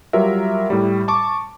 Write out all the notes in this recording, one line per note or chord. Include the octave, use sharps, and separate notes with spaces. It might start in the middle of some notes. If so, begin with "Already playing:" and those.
F#3 G3 F4 A#4 E5
A2 G3
A5 C#6 D6